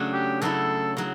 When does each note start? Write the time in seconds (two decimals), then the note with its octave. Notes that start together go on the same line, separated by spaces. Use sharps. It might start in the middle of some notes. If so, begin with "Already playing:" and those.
Already playing: C#3 F#3 A3 D4
0.13 G4
0.42 C#3 F#3 A3 E4 A4
0.97 C#3 F#3